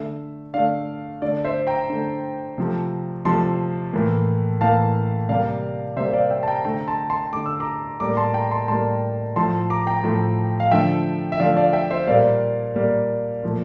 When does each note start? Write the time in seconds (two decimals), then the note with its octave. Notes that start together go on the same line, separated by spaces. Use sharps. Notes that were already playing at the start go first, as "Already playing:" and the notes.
Already playing: D3 A3 E5
0.54 D3 A3 D5 F5
1.22 D3 A3 D5
1.44 C5 E5
1.67 G5 A#5
1.90 D3 A3
2.58 C3 F3 A3
3.25 C3 F3 A3 A5 C6
3.93 A2 E3 A#3
4.61 A2 E3 A#3 F5 A5
5.29 C3 G3 A#3 D5 F5
5.97 C3 G3 A#3 C5 E5
6.13 D5 F5
6.30 E5 G5
6.43 A5
6.48 G5 A#5
6.65 D3 A3 G5 A#5
6.87 A5 C6
7.10 A5 C6
7.32 D3 A3 D6
7.46 E6
7.60 A#5 D6
8.00 A2 G3 A#3 A#5 D6
8.17 A5 C6
8.34 G5 A#5
8.51 A5 C6
8.68 A2 G3 A#3 A5 C6
9.36 A2 F3 A3 A5 C6
9.70 A#5 D6
9.87 G5 A#5
10.04 A2 F3 A3
10.60 F5
10.71 D3 F3 A3 E5 G5
11.32 E5
11.40 D3 F3 A3 D5 F5
11.57 D5 F5
11.73 E5 G5
11.90 C5 E5
12.07 A#2 G3 A#3 D5 F5
12.75 A#2 G3 A#3
13.43 A#2 F3 A3